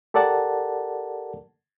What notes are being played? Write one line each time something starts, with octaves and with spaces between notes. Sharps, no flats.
G4 A4 A#4 D5 F#5 A5